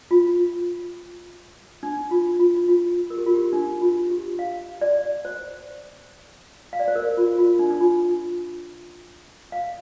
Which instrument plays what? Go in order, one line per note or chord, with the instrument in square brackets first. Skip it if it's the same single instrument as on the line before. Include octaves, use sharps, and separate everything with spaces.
[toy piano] F4
D4
F4
F4
F4
A#4
G4
F4
G4
D4
F4
G4
F5
D5
C5
F5
D5
C5
A#4
F4
F4
D4
D4
F4
F5